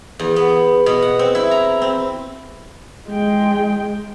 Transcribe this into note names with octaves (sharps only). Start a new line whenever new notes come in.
E2
B3
B2
F#5
C4
E4
A#5
C4
G#3 G5